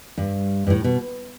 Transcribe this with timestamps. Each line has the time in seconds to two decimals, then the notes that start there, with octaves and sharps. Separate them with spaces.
0.18 G2
0.67 G2
0.70 A2
0.84 B2